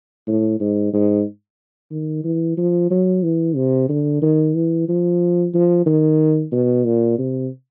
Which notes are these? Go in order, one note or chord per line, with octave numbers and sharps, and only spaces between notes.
A2
G#2
G#2
D#3
E3
F3
F#3
E3
C3
D3
D#3
E3
F3
F3
D#3
B2
A#2
C3